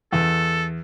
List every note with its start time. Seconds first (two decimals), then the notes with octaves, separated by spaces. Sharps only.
0.13 E2 A4